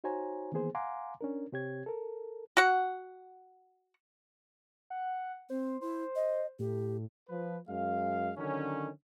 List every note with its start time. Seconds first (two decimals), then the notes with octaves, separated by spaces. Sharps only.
0.04 D#4 F#4 C5 C#5 G#5 A#5
0.52 D#3 E3 A#3 B3 G#4 C5
0.75 F5 F#5 G#5 A#5 C6 D6
1.21 C#4 D4 A#4
1.52 C3 C4 G4 C#5 G#6
1.86 A4 A#4
2.57 F#4 F#5
4.90 F#5
5.50 C4 C5
5.81 E4 C5
6.16 D#5
6.59 A2 G4
7.29 F3 B4
7.69 F#2 G#3 F5
8.37 D3 D#3 F#3 C#4